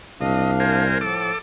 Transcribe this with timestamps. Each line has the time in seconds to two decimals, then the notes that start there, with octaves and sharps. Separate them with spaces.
0.21 C2 D4 D#5 F5
0.60 A#4 C5 G#5
1.01 A2 F3 A4 D6